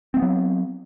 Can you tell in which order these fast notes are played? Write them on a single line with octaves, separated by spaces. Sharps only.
C4 A3 B3 F#3